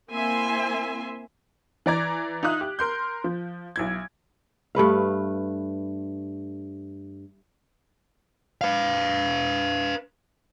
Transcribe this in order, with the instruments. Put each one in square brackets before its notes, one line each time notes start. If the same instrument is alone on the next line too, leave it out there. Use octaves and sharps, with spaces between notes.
[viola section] A#3 C4 E4 E5 G#5 C6
[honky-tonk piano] E3 D5 A#5 G#6
D#4 F4 E5 D#6 F#6
G4
A#4 C6 G6
F3
B1 E4 G#6
[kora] G2 A3 B4 F5
[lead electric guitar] B4 F5